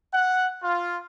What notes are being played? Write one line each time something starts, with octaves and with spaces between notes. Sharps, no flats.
F#5
F4